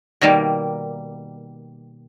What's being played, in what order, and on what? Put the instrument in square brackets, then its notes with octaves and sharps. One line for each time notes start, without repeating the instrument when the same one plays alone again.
[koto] B2 D#3 G3 A#3